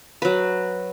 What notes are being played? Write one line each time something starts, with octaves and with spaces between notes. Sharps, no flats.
F#3 B4